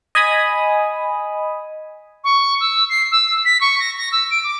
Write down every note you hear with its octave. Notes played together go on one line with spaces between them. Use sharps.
D#5 G#5 B5 D#6
C#6
E6
C7
E6
B6
C#6
A#6
A#6
E6
D7
D6